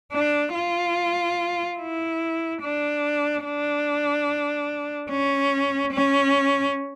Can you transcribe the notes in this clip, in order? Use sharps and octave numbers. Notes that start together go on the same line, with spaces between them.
D4
F4
E4
D4
D4
C#4
C#4